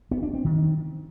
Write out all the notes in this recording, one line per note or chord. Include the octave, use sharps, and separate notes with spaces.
B3
D4
C4
D#3